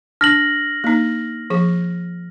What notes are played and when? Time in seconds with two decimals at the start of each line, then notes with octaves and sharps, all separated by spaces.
0.21 D4 F6 A#6 F#7
0.84 A#3 D#4
1.50 F3 G#4